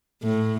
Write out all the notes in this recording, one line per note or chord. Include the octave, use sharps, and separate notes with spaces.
A2